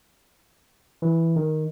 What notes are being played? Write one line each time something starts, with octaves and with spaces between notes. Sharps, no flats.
E3
D#3